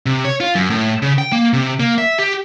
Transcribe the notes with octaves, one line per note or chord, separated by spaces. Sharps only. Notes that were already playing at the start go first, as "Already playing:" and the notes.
C3
C#5
F4
F#2
A2
C#3
G5
A#3
C3
A#3
E5
G4